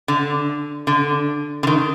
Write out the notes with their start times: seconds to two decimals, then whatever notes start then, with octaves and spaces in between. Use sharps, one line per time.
0.08 D3
0.87 D3
1.63 D3
1.67 D#3